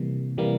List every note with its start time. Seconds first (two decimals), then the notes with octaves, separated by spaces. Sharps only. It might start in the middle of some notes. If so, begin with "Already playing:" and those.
Already playing: C3 E3 G3 A#3
0.38 C3 E3 G3 A#3